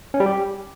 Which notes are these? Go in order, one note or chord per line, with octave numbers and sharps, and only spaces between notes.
C#4
G3
G4